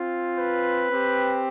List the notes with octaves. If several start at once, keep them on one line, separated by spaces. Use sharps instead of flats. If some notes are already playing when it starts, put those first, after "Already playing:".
Already playing: C4 F4
B4
C4 G4